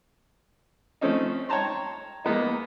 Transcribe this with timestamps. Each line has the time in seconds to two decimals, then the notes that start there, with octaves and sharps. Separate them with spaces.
1.01 F3 A3 C4 C#4 D#4
1.49 C#5 G5 A5 A#5 C6
2.24 G#3 A#3 B3 D#4